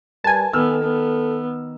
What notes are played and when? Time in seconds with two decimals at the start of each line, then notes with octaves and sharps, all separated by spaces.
0.24 G3 A#4 B4 G#5 A5
0.53 D#3 B3 A4 E6 F6
0.83 B3